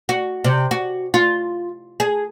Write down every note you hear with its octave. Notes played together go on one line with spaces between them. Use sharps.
F#4
C3
F#4
F4
G#4